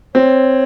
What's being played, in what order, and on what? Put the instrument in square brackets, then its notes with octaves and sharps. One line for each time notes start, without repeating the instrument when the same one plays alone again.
[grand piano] C4 [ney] C#5